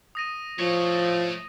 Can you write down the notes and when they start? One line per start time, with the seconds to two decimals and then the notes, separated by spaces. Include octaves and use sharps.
0.15 D#6 A#6 D#7
0.59 F3 A3 C#5